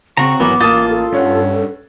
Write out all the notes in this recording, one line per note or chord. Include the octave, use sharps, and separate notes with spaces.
C#3 C4 F#4 A#5 C#6
G#1 E3 F#3 B3 A#4 D6
A1 A#3 F4 A5 D#6 A6
A4
G2 C#4 C#5 F#5